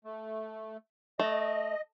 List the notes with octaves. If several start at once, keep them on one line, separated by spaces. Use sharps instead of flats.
A3
A3 D#5